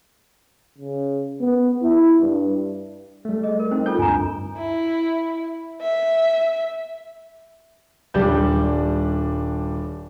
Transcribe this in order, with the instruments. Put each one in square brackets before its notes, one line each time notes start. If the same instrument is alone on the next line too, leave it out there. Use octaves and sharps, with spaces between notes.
[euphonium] C#3
B3
E4
G2
[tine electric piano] G3 A3
[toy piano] G#4 D#5
A#4
[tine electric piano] C4 [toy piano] D#4 C5
[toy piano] F4 A4 G5 [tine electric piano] G6
[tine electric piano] D2 G2 [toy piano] G#5 A#5
[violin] E4
E5
[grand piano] D#1 G3 D4 G6